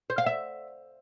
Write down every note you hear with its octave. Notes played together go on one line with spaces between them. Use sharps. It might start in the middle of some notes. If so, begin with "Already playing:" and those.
C5
F5
E5